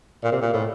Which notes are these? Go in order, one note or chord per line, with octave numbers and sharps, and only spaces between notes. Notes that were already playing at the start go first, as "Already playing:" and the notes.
A#2
C3
A#2
A2